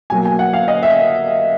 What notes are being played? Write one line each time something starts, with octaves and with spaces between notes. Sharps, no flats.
B2 F#3 A#3 G#5
G#5
F#5
F5
D#5
E5